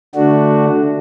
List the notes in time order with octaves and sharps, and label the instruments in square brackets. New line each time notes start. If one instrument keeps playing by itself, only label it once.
[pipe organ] D3 A3 D4 F#4